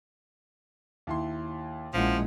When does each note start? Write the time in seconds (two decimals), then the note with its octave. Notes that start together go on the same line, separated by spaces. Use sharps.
1.07 D#2 E4 C6
1.94 A#1 F3 G#3 C#4 E4 F#5